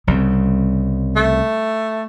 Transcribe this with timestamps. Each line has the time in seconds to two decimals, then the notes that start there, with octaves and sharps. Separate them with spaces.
0.07 C2 C#3 G3 C4
1.17 A3